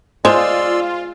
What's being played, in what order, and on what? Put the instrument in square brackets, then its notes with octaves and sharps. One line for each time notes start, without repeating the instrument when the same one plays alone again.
[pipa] G#3 [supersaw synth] F4 [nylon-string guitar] C5 [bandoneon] D5 C6 E6